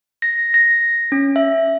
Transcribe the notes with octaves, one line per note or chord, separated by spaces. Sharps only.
A#6
A#6
C#4
E5